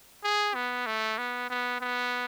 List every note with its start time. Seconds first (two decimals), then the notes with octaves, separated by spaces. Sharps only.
0.24 G#4
0.54 B3
0.86 A3
1.18 B3
1.50 B3
1.81 B3